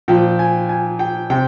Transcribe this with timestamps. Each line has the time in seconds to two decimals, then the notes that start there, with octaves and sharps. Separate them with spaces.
0.08 A#2 F3 G5
0.39 G#5
0.69 G#5
0.99 G5
1.30 C3 G5